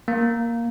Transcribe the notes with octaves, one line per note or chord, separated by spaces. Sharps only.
A#3